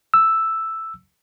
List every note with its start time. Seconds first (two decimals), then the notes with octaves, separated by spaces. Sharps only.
0.14 E6